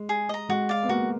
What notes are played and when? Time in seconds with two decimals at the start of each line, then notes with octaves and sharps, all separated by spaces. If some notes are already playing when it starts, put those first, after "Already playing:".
Already playing: G#3
0.09 G#4
0.29 D#5 A#5
0.49 G#3 F#4
0.69 D5 F5
0.83 B3
0.89 A#3 F#4